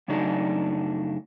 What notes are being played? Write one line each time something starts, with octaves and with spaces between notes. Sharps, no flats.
F#2 C#3 F#3 A3 D4 D#4